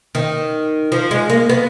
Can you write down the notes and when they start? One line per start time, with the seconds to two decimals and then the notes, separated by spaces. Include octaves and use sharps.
0.15 D#3
0.92 F3
1.11 G#3
1.30 A#3
1.49 B3